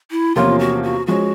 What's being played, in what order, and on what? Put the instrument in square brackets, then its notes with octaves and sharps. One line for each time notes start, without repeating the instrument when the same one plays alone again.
[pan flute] E4
[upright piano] E2 C3 F3 A#3 C#4 [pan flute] F4
[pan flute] F#4
F#4
[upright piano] F3 G#3 C#4 [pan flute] F#4